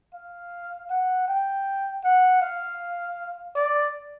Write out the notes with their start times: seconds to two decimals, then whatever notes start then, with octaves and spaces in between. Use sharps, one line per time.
0.14 F5
0.90 F#5
1.28 G5
2.04 F#5
2.42 F5
3.56 D5